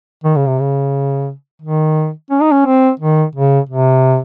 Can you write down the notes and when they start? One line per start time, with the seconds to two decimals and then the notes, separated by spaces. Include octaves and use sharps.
0.24 D#3
0.36 C#3
0.47 C3
0.61 C#3
1.62 D#3
2.31 C#4
2.42 D#4
2.51 C#4
2.66 C4
3.00 D#3
3.35 C#3
3.69 C3